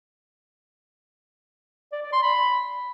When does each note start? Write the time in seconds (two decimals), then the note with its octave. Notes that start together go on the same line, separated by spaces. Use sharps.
1.92 D5
2.02 D5
2.12 C6
2.23 B5